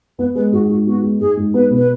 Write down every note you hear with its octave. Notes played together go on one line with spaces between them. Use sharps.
B3 B4
G#3 B4
G#2 F#4
G#2 F#4
B3 F#4
G#3
G#2 G#4
G#2
B3 B4
B2
B4